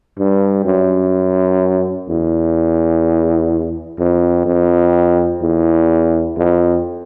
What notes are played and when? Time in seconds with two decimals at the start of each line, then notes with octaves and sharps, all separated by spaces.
0.19 G2
0.65 F#2
2.08 E2
3.98 F2
4.46 F2
5.42 E2
6.36 F2